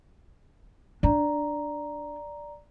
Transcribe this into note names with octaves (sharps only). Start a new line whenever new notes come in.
D4 D5 A#5